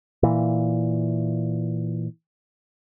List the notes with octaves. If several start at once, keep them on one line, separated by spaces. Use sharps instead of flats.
A#2 E3